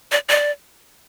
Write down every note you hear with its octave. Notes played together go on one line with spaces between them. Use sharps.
D5
D5